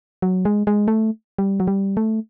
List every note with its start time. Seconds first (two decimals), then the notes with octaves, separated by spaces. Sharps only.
0.22 F#3
0.45 G#3
0.67 G#3
0.88 A3
1.38 G3
1.60 F#3
1.68 G3
1.97 A3